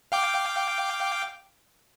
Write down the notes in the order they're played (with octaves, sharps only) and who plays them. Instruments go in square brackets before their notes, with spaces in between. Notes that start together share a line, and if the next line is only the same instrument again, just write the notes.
[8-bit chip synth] F5 G5 D6